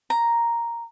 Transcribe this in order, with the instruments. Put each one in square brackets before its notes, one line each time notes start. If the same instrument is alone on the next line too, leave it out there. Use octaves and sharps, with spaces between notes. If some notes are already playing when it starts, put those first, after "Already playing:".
[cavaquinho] A#5